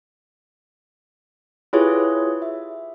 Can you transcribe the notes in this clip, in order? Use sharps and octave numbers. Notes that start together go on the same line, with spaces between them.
E4 F4 G4 G#4 B4 C#5
E5